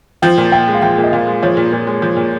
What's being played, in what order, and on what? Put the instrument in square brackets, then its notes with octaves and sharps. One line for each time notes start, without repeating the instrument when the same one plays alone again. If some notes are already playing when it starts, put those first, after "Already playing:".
[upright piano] F3 [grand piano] G5
[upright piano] A#2
[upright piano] A#2 [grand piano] G5
[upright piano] G#3
[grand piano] F5
[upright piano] F3 [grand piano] G5
[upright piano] A#2
[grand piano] D#5
[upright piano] A#2 [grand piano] F5
[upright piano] G#3
[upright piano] F3 [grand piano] C#5
[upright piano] A#2
A#2
G#3
F3
A#2